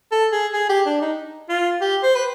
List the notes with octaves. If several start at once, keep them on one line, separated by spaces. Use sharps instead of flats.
A4
G#4
G#4
G4
D4
D#4
F4
G4
C5
B4